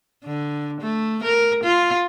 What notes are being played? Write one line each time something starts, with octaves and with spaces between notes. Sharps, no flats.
D3
A3
A#4
F4